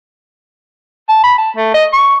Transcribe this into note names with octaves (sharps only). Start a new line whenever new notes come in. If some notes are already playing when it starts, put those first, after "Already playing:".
A5
B5
A5
A3
D#5
C#6